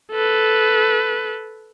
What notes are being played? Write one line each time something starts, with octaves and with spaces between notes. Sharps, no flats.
A4 B4